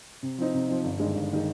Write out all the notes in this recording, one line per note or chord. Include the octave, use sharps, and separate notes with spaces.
C3
F3 C4 D#4
C3
F3 C4 D#4
G1
G2 D#3 G#3
G1
D#3 G#3